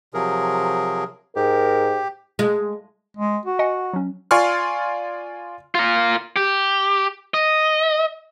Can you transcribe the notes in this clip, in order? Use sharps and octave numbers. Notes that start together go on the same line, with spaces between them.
C3 F3 F#3 G#4 A#4
G#2 G4 A#4
G#3
G#3
F#4
D#5 F#5 G#5
F#3 C#4
F4 D5 G#5 C6 C#6 F6
F4 A#4
G4
D#5